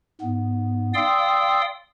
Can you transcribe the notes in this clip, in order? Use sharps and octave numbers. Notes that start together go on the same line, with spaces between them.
G#2 B3
D5 F5 G5 C6 D#6 E6